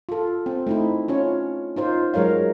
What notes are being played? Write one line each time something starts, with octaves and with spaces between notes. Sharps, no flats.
F4 A4
C4
A3 D#4 E4
C#4 F4 C#5
D#4 F4 C5
F#3 G#3 A#4 C#5 F5